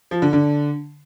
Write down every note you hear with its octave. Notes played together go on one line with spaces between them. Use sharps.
F3
D3
D3